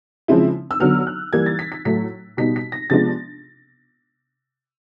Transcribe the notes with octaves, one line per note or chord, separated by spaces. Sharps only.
C#3 F3 G#3 C4 E4
E6
D3 F#3 B3 F6
F#6
E3 G3 A#3 G#6
A6
B6
B6
A2 F#3 A3 B6
B2 G3 B3 D#4 B6
B6
A#6
C3 F3 G#3 B3 D4 A6